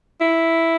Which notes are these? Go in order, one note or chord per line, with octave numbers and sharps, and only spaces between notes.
E4